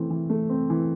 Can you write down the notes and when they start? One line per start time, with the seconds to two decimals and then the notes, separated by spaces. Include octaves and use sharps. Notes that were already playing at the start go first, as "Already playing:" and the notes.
Already playing: E3 A3 C4
0.10 E3
0.30 A3
0.49 C4
0.70 E3